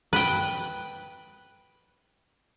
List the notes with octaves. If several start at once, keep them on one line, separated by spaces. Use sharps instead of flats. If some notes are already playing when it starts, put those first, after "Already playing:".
B4 G5